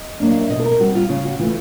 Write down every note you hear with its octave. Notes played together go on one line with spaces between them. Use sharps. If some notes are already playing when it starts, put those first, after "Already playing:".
Already playing: D#5
F#3 A#3 D4
F5
E5
B2 D#5
A4
A#4
G3 C4 F#4
F4
C#3 F4
F#4
E3 A3 F4